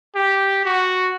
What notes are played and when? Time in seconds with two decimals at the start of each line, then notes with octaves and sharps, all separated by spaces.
0.15 G4
0.65 F#4